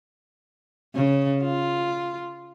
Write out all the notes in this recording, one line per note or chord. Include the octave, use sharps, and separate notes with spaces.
C#3
F4